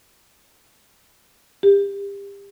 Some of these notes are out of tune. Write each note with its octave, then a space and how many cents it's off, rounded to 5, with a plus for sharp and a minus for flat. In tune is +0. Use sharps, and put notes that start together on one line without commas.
G4 +30